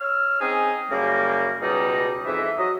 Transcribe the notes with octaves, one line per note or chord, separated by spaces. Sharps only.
C#5 E6 F6
C4 C#4 D#4 G#4
F#2 C#3 G3 A#3
C#2 B2 G3 D#4
F2 G#2 E3 E5
F#3 D#5